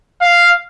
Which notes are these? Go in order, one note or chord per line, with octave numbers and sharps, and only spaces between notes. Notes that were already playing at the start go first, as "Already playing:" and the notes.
F5